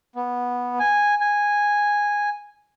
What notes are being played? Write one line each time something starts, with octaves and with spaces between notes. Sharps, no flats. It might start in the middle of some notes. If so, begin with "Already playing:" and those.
B3
G#5
G#5